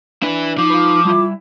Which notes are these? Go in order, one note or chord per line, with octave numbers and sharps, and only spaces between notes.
D4 E4 B4
F3 D#4 D6
F4 B4
G3 E4 F4 E5